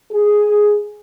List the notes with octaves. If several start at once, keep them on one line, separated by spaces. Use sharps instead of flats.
G#4